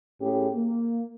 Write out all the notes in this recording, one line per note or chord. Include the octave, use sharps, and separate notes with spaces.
A2 C#4 G4 G#4
A#3